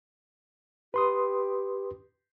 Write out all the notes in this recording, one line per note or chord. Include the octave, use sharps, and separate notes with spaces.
G4 B4 C6 D#6